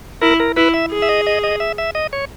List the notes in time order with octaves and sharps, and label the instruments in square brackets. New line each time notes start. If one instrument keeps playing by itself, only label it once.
[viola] E4 [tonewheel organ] A#4
[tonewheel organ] A#4
[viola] E4 [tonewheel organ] B4
[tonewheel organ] E5
[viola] G#4
[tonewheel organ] E5
D#5
D#5
D#5
E5
E5
D#5
C#5